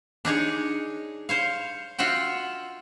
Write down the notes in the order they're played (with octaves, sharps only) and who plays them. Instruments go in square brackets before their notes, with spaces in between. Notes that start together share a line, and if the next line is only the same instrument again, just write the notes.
[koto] D4 D#4 G#4 C#5
C5 C#5 F5
F4 F#4 E5 F#5 G5